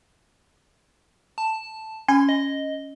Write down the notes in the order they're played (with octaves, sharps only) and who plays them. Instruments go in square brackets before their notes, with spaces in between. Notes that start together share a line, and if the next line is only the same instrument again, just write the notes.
[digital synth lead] A5
[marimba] C#4 [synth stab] G#5 [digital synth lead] C6
[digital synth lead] D#5